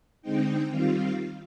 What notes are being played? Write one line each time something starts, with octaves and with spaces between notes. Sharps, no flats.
D3 G#3 C4 D#4 G5
D#3 G3 C4 F4 F5